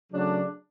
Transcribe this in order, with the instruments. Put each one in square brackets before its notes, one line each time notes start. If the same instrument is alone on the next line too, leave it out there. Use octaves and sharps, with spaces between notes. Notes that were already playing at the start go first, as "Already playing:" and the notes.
[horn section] C#3 F#3 A3 D4